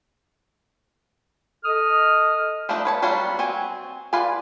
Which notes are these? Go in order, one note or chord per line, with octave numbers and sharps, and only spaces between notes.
A4 D#5 D#6 F6
F3 A3 B3 D4 D#4
B4 C#5 A5
F#3 G3 B3 F4 F#4
C4 F#4 G#5
F4 B4 D5 G#5